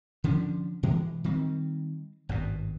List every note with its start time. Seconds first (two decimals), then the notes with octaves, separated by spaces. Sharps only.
0.24 D3 F3 C#4 D4
0.83 B2 E3 G#3
1.24 D#3 G3 C4
2.29 G#1 G2 B2